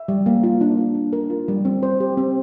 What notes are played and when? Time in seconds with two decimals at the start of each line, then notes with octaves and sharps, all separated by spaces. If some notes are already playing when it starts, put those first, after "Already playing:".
Already playing: E5
0.08 G3
0.26 A#3
0.44 F4
0.61 D4
0.78 A#3
0.95 D4
1.13 A#4
1.30 F4
1.48 G3
1.65 C4
1.83 C5
2.00 G4
2.17 C4